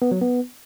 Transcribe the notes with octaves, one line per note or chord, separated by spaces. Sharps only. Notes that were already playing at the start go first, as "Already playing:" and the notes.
B3
F#3
B3